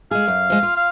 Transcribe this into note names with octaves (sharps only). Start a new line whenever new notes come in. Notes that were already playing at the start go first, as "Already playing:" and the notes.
G#3 G#4 F5
F#2
F3 G#3
F4
F5